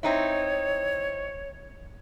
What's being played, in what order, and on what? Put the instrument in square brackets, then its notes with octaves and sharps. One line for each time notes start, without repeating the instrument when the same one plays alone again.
[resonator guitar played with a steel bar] C4 D#4 E4 [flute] C#5